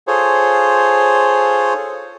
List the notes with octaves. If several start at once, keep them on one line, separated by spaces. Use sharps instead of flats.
F4 G#4 A4 C5 C#5